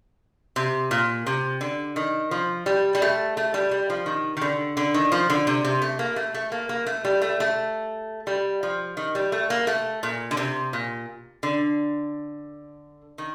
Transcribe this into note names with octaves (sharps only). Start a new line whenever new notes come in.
C3
A#2
C3
D3
D#3
F3
G3
G3
A3
A3
G3
G3
F3
D#3
D#3
D3
D3
D#3
F3
D3
C3
C3
A3
A#3
A3
A3
A#3
A#3
A3
G3
A3
A3
G3
F3
D#3
G3
A3
A#3
A3
A#2
D3
C3
A#2
D3
D#3